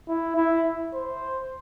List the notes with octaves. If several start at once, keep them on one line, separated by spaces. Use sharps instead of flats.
E4
E4
C5